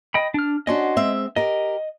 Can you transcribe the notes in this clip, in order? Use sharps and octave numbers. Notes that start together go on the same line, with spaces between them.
D#5 G5 B5
D4 F6
C#4 D4 F#4 D#5 C6
G#3 C4 E5
G4 A#4 D#5